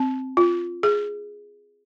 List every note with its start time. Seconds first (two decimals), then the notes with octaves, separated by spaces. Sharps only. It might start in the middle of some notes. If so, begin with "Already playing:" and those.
Already playing: C4
0.37 F4
0.83 G#4